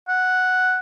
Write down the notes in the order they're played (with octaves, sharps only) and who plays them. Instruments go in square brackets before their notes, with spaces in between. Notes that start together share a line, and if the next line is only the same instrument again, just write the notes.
[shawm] F#5